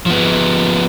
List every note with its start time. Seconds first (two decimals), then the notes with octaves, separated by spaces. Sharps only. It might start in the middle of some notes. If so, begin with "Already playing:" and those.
0.06 F3 B3